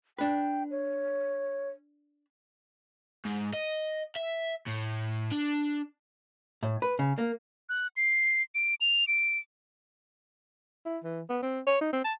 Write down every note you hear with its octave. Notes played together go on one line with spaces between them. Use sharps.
D4 B4 G5
C#5
G#2
D#5
E5
A2
D4
A2
B4
C#3
A#3
F#6
C7
D7
F7
D7
E4
E3
B3
C4
C#5
D#4
C4
A5